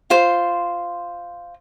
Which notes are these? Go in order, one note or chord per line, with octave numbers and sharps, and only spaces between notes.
F4 C5